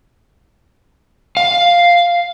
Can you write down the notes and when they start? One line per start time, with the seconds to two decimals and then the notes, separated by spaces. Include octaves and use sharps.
1.37 F5